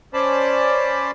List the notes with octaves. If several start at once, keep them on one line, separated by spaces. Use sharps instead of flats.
C#4 C5 D5 A5 B5